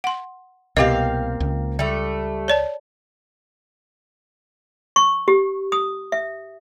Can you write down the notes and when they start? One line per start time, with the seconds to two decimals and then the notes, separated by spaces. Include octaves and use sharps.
0.04 F#5 C6
0.77 C2 B2 A#3 C4 G4 D#5 F5
1.40 C#2
1.79 G3 A3
2.48 C#5 D5 A5
4.96 C#6
5.28 G4
5.72 D#6
6.12 E5